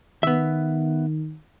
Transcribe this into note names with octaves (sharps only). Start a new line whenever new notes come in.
D#3 B3 E5